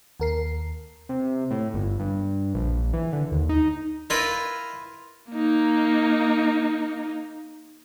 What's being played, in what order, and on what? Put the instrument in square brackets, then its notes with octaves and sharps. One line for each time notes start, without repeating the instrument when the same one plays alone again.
[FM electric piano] D#2 A#4 C7
[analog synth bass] C3
A2
G1
G2
A#1
E3
D3
D#2
D#4
[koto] E4 F4 B4 [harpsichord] A#4 D#5
[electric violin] A#3 D#4